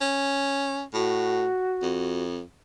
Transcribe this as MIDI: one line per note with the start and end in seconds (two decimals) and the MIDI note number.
0.01 0.83 61
0.94 1.48 45
0.94 2.23 66
1.82 2.42 41